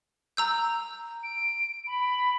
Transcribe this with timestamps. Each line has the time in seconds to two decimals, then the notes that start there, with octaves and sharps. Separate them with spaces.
0.37 A#5 E6 G6
1.23 D7
1.87 B5